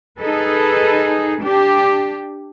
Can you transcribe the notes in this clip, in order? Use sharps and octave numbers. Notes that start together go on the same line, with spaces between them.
D#4 G#4 A4 B4
D4 G4